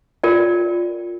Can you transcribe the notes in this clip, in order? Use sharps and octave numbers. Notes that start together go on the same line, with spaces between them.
F4 A#4 D5 G5